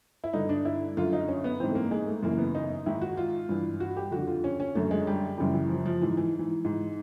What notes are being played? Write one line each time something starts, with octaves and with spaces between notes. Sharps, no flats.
E4
G2 D3 D#4
D4
E4
F#2 D3 F4
D#4
C#4
B3
G#2 E3 C4
A3
A#3
G#3
A3
F#2 C#3 E3 A#3
B3
D#4
G#2 D#3 E4
F#4
F4
G2 E3
F#4
G4
F2 D3 F#4
F4
C#4
C#4
F#2 D3 A3
G#3
G3
F#2 C#3 E3 G3
E3
F3
F3
G#2 E3
E3
E3
G#2 E3